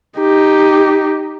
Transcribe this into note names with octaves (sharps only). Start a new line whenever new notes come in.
D#4 G4